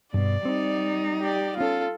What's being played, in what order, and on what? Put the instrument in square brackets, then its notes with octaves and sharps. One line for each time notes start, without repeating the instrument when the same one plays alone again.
[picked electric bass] G2 [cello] B2 [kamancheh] D5
[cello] G3 D#4 [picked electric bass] C4
[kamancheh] G4 D5
[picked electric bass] B3 C#4 [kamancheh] F4 A4